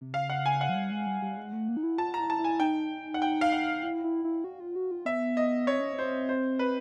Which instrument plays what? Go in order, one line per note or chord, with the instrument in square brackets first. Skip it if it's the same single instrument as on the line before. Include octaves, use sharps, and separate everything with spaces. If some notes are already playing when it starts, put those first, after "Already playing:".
[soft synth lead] C3
[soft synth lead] C#3 [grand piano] F5
[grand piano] F#5
G#5
F#5
[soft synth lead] F#3
G3
G#3
G3
G3
G#3
A3
A#3
D#4
E4
[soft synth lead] F4 [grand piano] A5
[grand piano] A#5
[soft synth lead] E4
[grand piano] A5
[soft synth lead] E4
[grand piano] G#5
[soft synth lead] D#4 [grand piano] G5
[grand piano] F#5
G5
F5
F#5
[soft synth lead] E4
E4
E4
F#4
F4
F#4
F4
[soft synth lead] B3 [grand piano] E5
[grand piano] D#5
[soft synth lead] C4 [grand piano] C#5
[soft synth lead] C#4
C4
[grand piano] C5
C5
B4